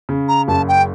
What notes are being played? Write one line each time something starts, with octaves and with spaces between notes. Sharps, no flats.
C#3
A#5
F#1 A5
G5